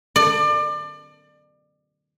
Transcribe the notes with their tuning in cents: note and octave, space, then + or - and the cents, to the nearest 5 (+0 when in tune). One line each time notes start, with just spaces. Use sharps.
D5 +30